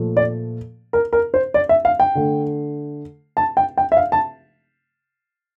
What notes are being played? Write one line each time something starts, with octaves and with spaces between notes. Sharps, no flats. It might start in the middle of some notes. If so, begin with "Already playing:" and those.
Already playing: A#2 F3 A3
D5
A#4
A#4
C5
D5
E5
F5
G5
D3 A3
A5
G5
G5
E5
F5
A5